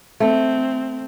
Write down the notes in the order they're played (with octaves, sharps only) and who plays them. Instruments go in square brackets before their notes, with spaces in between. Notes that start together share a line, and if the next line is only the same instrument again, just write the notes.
[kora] A3 [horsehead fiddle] C4